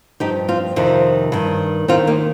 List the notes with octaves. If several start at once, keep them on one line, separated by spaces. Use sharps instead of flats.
G2 F3 D#4 G4
C4 F4
F2 C3 D#3 C4 F4
G2 D#3
D#2 D#3 C4 F4
A#3 D#4